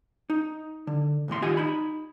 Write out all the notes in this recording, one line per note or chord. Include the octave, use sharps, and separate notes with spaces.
D#4
D3
B1 E2 A2 C6
D#3 F4 G4 D#5 F#5 G#5
D#4 B5